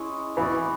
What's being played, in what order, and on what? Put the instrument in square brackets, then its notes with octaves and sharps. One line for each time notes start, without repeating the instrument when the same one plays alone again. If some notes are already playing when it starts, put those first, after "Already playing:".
Already playing: [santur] G#3 C#4 E4 G#4 C#5
[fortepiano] E3 [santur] B3 F#4 B4 D5